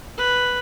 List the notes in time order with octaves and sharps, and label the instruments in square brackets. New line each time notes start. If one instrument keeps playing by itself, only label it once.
[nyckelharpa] B4